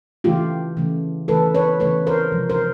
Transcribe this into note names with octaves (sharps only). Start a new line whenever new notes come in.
C#3 E3 A3 F4 G4
C#3 E3 A3
C#3 E3 A3 A4 B4
B4 C#5
C#3 E3 A3 B4 C#5
A#4 C5
C3 F3 G#3
A#4 C5